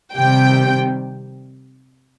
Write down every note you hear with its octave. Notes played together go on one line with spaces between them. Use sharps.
C3 D#3 G3 G5